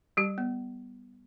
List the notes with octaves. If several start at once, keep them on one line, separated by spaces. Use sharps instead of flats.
G3 G4
B3